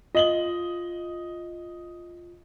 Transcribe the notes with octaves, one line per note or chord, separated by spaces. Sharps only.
F4 D#5 F#7 G7